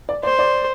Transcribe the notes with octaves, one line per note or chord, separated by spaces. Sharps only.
D5
C5 D5
D5